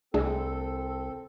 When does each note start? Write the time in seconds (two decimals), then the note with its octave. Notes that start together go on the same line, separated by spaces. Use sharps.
0.14 C2 A3 C4 D4 G#4 A4